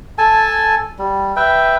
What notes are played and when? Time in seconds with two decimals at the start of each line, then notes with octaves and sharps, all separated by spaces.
0.18 A4 G#5 A5
0.99 G3
1.36 B4 E5 G5